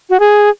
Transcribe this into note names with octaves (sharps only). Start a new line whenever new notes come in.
F#4
G#4